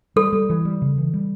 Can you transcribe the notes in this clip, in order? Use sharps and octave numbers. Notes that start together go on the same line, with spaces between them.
G3 A4
G3
E3
G3
C#3
E3
G3